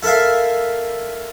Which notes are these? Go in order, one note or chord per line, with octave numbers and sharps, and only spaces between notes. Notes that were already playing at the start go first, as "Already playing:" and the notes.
E4 A4 A#4 E5 F5